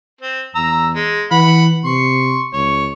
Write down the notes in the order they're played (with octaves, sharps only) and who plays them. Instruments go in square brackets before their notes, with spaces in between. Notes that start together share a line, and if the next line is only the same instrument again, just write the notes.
[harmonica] C4
[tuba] E2 [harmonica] A#5 E6
[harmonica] G#3
[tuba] E3 [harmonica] F#5 B5
[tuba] C3 [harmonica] C6 C#6
[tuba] C#2 [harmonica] C#5